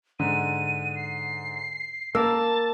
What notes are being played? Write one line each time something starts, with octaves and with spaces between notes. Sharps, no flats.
G#2 D3 D#7
C7
A#3 A#4 A5 E6